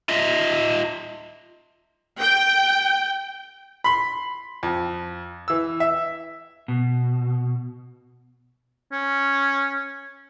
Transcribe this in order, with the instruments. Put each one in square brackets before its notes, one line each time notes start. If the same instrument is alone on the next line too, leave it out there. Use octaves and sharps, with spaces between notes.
[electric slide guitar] F4 D#5 E5
[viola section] G5
[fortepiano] B5 C6
F2
E3 E6
E5
[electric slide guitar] B2
[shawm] C#4